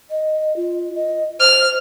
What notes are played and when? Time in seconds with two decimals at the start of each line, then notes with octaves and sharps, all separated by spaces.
0.10 D#5
0.56 F4
0.95 D#5
1.40 C5 F6